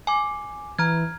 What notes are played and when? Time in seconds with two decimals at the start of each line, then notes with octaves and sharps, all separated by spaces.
0.07 G#5 D6
0.79 E3 A#5 F6 G#6